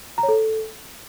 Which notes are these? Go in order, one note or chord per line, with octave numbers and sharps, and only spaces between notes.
A#5
C#5
A4